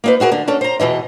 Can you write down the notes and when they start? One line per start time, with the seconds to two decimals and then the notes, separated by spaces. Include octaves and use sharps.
0.04 A#3 D#4 B4
0.20 E4 F#4 G#4 A#4
0.32 D3
0.48 C#4 D4 A4
0.61 C5 A#5
0.80 E2 B2 E3 D#5